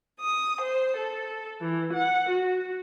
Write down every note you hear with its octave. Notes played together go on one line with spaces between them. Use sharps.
D#6
C5
A4
E3
F#5
F#4